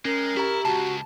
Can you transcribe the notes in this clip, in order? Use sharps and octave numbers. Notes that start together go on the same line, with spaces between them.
G#3 C#4 A#4
E4 G4 A#5
C#2 F#4 A5